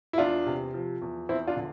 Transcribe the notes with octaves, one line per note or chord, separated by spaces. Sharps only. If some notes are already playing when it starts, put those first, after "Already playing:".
E4
E2 D4 F4
C3
F3
E2
E2 C4 E4
D4 F4
D3